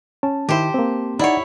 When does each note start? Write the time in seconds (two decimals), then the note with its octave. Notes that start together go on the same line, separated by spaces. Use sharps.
0.23 C#4 A5
0.49 D#3 E4 G4 C5
0.74 A#3 C4
1.19 D#4 E4 C#5 D5 F#5